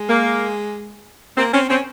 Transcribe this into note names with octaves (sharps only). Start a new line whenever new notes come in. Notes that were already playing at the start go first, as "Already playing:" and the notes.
Already playing: G#3
A#3
A#3 C4
C4 C#4
C4 C#4